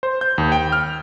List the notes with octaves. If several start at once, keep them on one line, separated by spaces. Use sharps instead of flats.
C5
G6
D#2
G5
F6